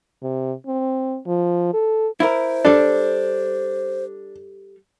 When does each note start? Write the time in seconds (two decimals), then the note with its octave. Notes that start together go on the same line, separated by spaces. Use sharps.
0.23 C3
0.67 C4
1.27 F3
1.74 A4
2.20 E4 A#4 C5
2.65 G3 D4 A4